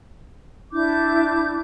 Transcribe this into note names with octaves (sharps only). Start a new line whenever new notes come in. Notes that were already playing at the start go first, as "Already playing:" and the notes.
D4 E4 D6 G6